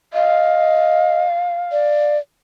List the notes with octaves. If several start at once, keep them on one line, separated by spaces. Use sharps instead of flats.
D#5 F5
D5